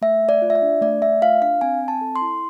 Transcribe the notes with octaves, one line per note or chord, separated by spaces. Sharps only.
A3 E5
A3
D5
F4
E5
D5
D4
A3 D5
A3 E5
F4 F5
D4 F5
C4 G#5
C4
A5
A4
C6
E4